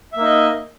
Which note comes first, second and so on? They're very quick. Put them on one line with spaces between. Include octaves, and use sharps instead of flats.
E5 A#3 D#4 D#5